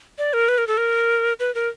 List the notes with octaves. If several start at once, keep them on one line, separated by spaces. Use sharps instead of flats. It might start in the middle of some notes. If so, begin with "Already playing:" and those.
D5
A#4
B4
A#4
A4
A#4
B4
A#4